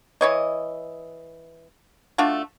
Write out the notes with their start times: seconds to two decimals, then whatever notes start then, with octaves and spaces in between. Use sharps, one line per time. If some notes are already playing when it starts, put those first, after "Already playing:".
0.21 E3 C#5 D#5
2.18 A3 D4 F4 F#4